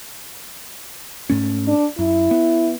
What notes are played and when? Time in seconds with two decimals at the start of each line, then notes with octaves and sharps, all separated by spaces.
1.30 G#2 A3 C#4
1.67 D4
1.99 F#2 E4
2.31 B3